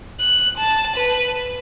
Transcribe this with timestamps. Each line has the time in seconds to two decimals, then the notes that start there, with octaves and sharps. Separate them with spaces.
0.20 F#6
0.58 A5
0.96 B4